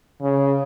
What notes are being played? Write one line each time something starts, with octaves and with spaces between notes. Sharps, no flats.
C#3